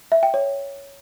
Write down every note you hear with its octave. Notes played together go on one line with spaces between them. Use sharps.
E5
G5
C#5